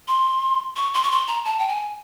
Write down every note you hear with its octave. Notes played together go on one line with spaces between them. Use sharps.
C6
C#6
C6
C#6
C6
A#5
A5
G5
G#5